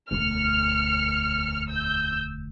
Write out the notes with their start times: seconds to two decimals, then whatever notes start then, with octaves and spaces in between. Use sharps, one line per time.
0.11 E1 D2 F6 C#7
1.70 E6 G6